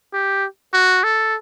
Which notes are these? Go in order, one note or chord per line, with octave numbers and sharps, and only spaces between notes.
G4
F#4
A4